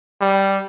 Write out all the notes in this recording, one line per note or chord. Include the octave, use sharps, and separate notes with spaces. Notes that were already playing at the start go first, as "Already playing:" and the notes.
G3